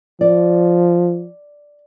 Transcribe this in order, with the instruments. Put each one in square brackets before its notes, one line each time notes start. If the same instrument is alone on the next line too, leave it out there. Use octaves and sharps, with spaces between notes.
[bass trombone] F3 [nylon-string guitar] D5